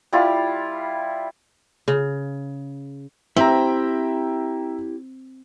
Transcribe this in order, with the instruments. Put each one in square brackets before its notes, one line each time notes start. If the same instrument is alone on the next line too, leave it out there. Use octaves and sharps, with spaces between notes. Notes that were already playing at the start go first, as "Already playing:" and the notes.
[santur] G3 E4 F4
[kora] C#3
[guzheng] C4 [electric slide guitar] E4 G4 [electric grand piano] E5 G5 A#5